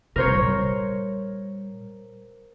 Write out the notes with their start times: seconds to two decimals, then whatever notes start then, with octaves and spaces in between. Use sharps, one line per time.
0.16 C3 A#4 C5 C#5
0.27 A#2 G3